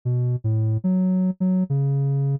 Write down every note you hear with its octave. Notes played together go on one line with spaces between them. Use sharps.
B2
A2
F#3
F#3
C#3